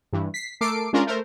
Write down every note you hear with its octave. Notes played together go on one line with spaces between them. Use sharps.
G2 E3
B6 C7
A3 A4 A#4 D6 C7 D7
G#3 C#4 D4 F4 A#4
A3 A#4 C5